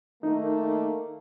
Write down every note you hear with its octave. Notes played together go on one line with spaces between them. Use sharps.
D#3 A3 A#3 D#4